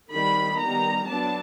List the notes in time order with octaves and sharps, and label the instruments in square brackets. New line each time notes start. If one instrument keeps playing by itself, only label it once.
[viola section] D#3 G3 C4 B5
D#3 G3 B3 A#5
F#3 B3 D4 A5